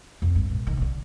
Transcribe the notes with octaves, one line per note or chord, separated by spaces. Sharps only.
F2
G2
A#2
D#3
C3
D3